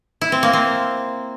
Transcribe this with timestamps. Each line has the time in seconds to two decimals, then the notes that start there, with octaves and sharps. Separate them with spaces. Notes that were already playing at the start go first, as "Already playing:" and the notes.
0.21 E4
0.32 C4
0.43 A#3
0.53 C4